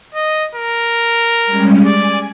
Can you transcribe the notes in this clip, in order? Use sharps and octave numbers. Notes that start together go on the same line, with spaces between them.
D#5
A#4
G3 G#3 C#4
D5 G#5